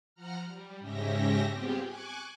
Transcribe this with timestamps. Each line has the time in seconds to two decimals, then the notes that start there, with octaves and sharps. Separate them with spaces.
0.15 F3 F#5 A#5 F6
0.43 G3
0.79 G#2 C#3 C#4 G4 E5 A#6
1.50 G3 B3 C4 F4 G4 G#4
1.85 G#5 C#6 D6 F#6